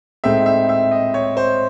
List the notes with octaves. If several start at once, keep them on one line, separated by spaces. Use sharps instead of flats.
A2 G#3 C4 D#4 E5
E5
E5
D#5
C#5
C5